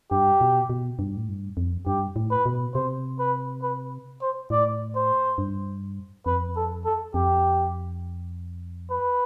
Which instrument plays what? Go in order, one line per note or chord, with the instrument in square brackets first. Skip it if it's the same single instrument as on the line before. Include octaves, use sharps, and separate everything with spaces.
[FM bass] G2 [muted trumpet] G4
[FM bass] B2
B2
G2
A2
G2
F2
[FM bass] G2 [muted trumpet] G4
[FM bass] A2
[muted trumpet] B4
[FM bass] B2
[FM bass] C3 [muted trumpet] C5
[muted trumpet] B4
B4
C5
[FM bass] A2 [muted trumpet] D5
[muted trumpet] C5
[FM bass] G2
[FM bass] F2 [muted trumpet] B4
[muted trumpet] A4
A4
[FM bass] F2 [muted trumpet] G4
[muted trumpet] B4